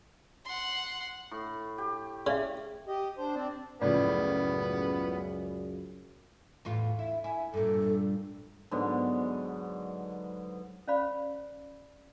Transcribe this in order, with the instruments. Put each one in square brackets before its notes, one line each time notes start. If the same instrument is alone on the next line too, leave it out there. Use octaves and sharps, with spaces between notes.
[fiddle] F#5 C6
[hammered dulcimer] A2
G4
[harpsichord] C#3 [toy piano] D5 E5
[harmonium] G4 D#5
D4 C5
C4 D4 D5
[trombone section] C#2 F#2 [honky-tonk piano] A2 C#3 F3 [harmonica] B3 [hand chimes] D5
[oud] E2 A2 F4
[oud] E4 [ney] E5
[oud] E4 [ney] G#5
[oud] G2 A#2 [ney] A4
[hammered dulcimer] G#2 D3 F#3 B3
[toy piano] C#4 C5 D5 F5 B5